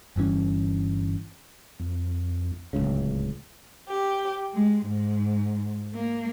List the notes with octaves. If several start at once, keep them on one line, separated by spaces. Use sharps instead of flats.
G1 G2 E3 C#4
F2
D1 G#1 C#2 C#3
G4
G#3
G#2
A#3